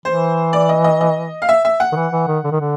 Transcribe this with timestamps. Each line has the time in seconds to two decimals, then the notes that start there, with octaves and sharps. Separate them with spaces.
0.05 E3 C5
0.53 D5
0.69 D#5
0.84 D#5
1.01 D#5
1.42 F5
1.49 E5
1.65 E5
1.80 F#5
1.92 D#3
1.96 E3
2.12 E3
2.27 D#3
2.44 D3
2.52 D#3
2.61 D3